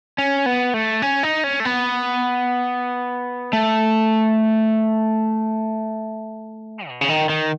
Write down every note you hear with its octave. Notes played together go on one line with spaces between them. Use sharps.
C#4
B3
A3
C#4
D#4
C#4
A3
B3
A3
B2
C#3
D#3
D#3